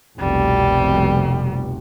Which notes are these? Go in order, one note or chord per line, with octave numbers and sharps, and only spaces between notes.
F1 C2 B2 G3